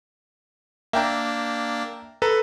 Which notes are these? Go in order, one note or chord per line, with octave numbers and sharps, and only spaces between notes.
A#3 D4 E5 G5 A#5
A4 B4 A#5